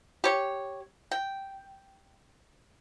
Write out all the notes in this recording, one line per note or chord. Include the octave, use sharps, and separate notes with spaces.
G4 C#5
G5